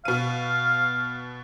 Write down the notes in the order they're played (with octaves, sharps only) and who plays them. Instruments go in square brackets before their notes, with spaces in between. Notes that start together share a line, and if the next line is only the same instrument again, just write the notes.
[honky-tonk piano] B2 D#7 [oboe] F5